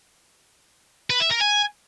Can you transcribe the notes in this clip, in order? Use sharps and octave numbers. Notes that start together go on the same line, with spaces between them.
B4
E5
A#4
G#5